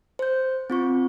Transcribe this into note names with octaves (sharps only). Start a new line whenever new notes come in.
C5 G6
C4 F4 C#6